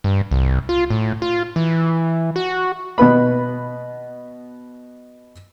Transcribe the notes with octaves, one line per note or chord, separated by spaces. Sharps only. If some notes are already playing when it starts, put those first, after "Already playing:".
G2
C2
F4
A2
F4
E3
F#4
B2 B3 B4 B5